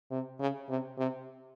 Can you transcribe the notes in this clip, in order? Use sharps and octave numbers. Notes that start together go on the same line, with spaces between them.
C3
C#3
C3
C3